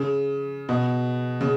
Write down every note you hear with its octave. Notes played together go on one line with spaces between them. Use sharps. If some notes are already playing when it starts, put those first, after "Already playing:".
Already playing: C#3
B2
C#3